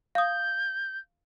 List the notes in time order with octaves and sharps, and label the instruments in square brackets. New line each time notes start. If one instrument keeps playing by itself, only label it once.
[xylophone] F5 D#6 [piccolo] G6